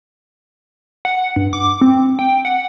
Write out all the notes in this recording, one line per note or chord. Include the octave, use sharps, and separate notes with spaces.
F#5
G2
D6
C4
G5
F#5